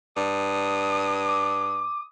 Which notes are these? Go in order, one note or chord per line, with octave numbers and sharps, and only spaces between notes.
G2 D#6
D6